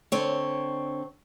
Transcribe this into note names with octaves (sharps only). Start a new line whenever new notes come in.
D3 C4 C#5